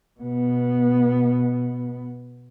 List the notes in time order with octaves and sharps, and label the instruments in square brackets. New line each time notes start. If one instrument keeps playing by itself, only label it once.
[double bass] B2 B3